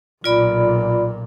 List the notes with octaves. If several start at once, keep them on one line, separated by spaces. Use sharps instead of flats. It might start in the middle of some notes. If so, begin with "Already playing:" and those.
B1 A#2 F4 D5 B5